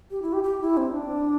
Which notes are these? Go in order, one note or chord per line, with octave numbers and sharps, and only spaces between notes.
G4
E4
G4
G4
E4
C4
D4